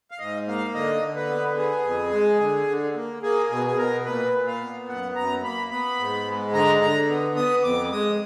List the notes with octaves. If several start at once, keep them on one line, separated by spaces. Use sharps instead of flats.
F5
G#2 D#5
A#3 F5
D3 D#5
D3
B4
B3
B3 G#4
F2
G#3
D3
D3
A#3
A#3 G#4
B2 G#4
G#4
B2 A#4
A#2 B4
A#2
F5
B3
F#2 F#5
F#2 A#5
A#3 B5
B3 B5
G#2
G#3
D3 A#5
D3 A#5
B3
B3 D#6
F2 D6
G#3 D#6